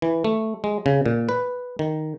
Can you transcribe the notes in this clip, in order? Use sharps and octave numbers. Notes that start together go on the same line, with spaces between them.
E3
A3
G#3
C#3
A#2
B4
D#3